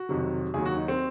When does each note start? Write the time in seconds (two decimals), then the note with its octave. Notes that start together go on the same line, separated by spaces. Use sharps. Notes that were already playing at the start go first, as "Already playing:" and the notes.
Already playing: F#4
0.09 F2 C3 D#3 F#3
0.54 D#2 D#3 F#3 G#4
0.65 F#4
0.76 D#4
0.88 C4